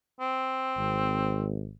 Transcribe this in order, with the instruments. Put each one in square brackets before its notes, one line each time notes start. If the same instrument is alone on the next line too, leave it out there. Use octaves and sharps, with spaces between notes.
[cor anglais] C4
[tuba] G#1